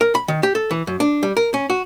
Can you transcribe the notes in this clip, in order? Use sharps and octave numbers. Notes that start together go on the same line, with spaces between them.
A#4
B5
D#3
G4
A4
E3
F#2
D4
G3
A#4
C#4
F#4